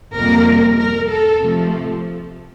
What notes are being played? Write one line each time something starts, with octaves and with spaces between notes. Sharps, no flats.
F2 C3 G3 A#3 A#4
A#4
A4
C3 F3 A3